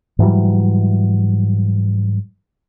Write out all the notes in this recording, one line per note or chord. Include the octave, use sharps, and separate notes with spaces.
G#2 E3 F#3 G3